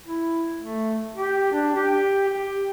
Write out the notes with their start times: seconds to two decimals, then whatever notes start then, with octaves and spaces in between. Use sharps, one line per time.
0.06 E4
0.59 A3
1.16 G4
1.52 D4
1.75 G4
2.29 G4